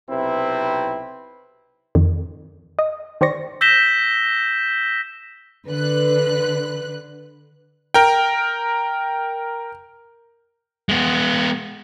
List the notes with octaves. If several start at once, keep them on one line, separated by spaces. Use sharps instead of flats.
B1 C3 C4 E4 B4
F2 D#3
D#5
D#3 G4 C5 D5 C#6 A#6
E6 G6 A#6 B6 E7 G7
D3 B4 F#6
A#4 G5
G#3 B3